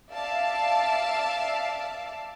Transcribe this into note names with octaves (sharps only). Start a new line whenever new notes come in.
D5 E5 F5 A5